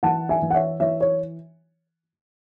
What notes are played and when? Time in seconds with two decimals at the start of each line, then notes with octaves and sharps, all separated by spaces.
0.03 E3 F#5 A5
0.29 E5 G#5
0.42 E3
0.50 F#5
0.54 C#5 E5
0.80 E3 C#5 E5
1.01 C#5